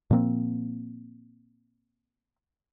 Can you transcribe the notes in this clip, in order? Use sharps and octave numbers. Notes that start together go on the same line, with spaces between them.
A#2 F3 A#3 C4